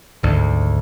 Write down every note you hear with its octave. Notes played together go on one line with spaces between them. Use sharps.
G#1 D2